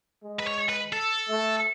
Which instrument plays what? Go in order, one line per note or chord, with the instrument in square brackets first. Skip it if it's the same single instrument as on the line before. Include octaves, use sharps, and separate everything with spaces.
[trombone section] G#3
[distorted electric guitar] B4
C#5
B4
A4
[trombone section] A3